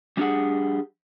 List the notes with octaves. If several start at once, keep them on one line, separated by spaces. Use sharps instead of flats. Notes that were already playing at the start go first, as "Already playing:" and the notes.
G3 D4 F4 G4 G#4 F#5